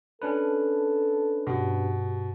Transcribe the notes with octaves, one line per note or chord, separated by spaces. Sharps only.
C#4 D4 A4 B4
G2 B2 G4